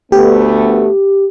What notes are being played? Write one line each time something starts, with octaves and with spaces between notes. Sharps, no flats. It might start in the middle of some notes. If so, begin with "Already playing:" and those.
D2 A3 B3 G4